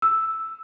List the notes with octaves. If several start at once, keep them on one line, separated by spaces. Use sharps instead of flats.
E6